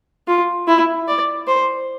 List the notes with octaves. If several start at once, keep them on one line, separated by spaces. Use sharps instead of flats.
F4
E4
D5
C5